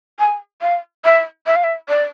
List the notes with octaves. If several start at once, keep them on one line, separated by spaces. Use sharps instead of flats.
G#5
F5
E5
E5
F5
E5
D5